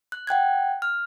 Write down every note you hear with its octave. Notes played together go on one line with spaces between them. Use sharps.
F#6
F#5 G5 F#6 G#6
F6